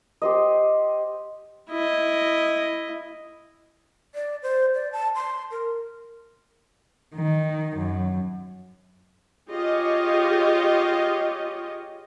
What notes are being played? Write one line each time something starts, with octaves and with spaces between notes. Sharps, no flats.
G4 C5 D#5
E4 D#5
D5
C5
D5
A5
C6
A#4
D#3
F#2
F4 G4 G#4 C#5 D#5